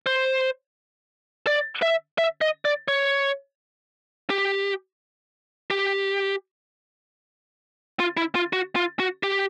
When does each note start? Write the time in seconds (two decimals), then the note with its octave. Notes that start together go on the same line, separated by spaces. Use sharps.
0.06 C5
1.47 D5
1.82 E5
2.18 E5
2.41 D#5
2.65 D5
2.88 C#5
4.30 G4
5.71 G4
8.00 F4
8.17 E4
8.35 F4
8.53 F#4
8.76 F4
9.00 F#4
9.23 G4